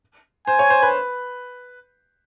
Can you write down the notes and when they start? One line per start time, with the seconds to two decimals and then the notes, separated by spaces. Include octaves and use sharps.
0.47 C5 G#5
0.59 C#5
0.70 C5
0.82 B4